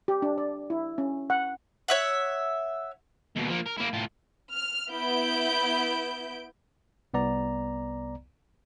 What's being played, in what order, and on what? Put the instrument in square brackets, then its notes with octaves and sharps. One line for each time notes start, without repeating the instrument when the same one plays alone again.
[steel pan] G4
D4
D5
E4
C#4
F#5
[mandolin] C#5 E5 F#5
[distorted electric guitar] D#2 B2
F3 A#3
A#4
A#3 E4
A2 F4
[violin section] F6
B3 E4 G6 D7
[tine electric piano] C2 B3 D5 A#5